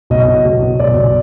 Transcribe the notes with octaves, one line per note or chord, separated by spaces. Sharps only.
B1 D#5
B2
B1
B2
B1 D5
B1